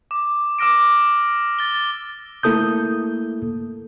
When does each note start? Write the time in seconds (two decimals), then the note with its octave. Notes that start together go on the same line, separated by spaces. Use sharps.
0.11 D6
0.59 D6 E6 F6 A#6 D7
1.59 A6 G7
2.43 A3 A#3 E4 A4 D#6 G6